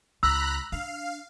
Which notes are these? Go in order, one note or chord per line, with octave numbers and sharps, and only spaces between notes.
C#2 A#5 B5 E6 F#6
D4 F5